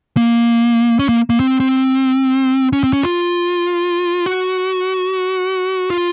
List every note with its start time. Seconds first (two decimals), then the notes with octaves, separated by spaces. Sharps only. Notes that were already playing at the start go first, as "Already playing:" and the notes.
0.17 A#3
0.99 C#4
1.09 A#3
1.30 A#3
1.40 C4
1.60 C4
2.73 C#4
2.84 C4
2.93 C#4
3.03 F4
4.26 F#4
5.90 F4